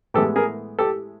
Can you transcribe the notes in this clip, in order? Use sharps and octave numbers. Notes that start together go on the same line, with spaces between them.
A2 E3 G#3 B3 G4 A4
G#4 A#4
G4 A4